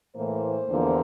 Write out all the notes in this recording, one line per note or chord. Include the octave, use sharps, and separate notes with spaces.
A2 E3 A#3 C5
E2 D3 F3 A#3